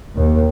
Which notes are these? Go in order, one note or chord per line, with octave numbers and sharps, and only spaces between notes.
D#2